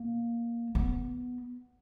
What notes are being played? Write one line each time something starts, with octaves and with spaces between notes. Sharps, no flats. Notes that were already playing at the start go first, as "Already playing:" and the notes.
Already playing: A#3
B3